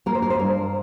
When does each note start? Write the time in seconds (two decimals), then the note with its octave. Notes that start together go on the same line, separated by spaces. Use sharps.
0.06 A#3 A#4
0.15 C5
0.22 A#4
0.30 C5
0.39 G2 A#4